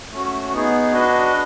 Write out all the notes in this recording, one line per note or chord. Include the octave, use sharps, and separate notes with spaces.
A3 C#4 F#4
B3 D#4 G#4
D4 F#4 B4 D#5